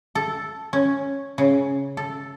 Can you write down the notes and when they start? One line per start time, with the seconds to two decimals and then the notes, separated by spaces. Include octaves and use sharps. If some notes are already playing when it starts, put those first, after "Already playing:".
0.15 A4
0.73 C#4
1.38 C#3
1.97 A4